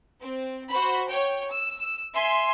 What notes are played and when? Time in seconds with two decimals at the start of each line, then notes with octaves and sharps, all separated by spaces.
0.20 C4
0.69 F#4 C5 B5
1.08 C#5 G5
1.50 E6
2.13 E5 G#5 C6